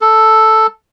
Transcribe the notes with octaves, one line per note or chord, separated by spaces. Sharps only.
A4